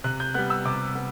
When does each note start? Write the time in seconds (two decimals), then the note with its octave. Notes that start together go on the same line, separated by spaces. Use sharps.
0.04 C3 F#6
0.20 G6
0.34 G3 B3 F#6
0.50 E6
0.65 C3 D6
0.95 B3